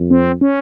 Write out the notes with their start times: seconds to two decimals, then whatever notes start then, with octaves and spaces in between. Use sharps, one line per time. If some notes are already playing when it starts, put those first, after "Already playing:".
Already playing: F2
0.11 C4
0.41 C#4